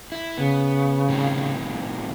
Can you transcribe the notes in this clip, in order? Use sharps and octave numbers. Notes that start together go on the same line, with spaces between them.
E4
C#3 B3
A2 C3 D#3